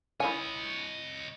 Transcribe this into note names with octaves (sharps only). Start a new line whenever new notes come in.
E4 C#5 D#5 G#5